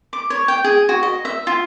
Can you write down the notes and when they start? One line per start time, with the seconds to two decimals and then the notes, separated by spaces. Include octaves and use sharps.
0.13 D6
0.30 C#5
0.48 G5
0.64 G#4
0.89 F#4
1.03 D#5
1.25 E5
1.47 F4